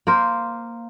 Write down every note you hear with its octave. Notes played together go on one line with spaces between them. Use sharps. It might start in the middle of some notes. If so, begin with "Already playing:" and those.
A#3 A#4 C5